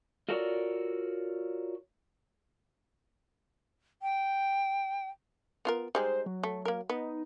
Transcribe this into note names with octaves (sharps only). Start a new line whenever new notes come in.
F4 F#4 A4 A#4 C#5 D5
G5
B3 F4 A#4
G3 G#3 D#4 C5
F#3
A3
A#3 A#4
B3 D#4